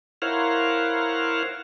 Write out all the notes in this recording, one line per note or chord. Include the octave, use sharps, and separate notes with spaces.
E4 A#4 C5 C#5 F5 F#5